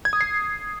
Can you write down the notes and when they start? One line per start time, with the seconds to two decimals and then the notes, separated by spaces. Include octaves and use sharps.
0.05 G#6
0.13 D#6
0.21 C7